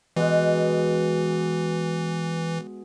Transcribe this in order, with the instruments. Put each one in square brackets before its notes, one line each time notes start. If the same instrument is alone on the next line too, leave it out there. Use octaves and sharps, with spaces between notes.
[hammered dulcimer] B2 G#3 [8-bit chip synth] E3